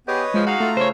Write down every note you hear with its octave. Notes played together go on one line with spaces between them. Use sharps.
B3 G4 G#4 B4 C#5 D#5
F3 G#3
D#4 F#4 F5
A3 F4 A#5
C#3 C5 C#5